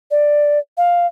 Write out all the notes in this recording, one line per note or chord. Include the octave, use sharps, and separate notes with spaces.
D5
F5